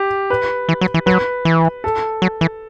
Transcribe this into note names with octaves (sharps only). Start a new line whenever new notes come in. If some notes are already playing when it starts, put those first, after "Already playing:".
Already playing: G4
B4
E3
F#3
E3
F#3 B4
E3
A4
F#3
E3